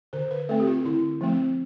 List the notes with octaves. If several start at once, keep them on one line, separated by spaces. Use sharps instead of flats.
D3 C5
B4
A3 C4 A4
G4
F4
D3 E4
F3 A3 C4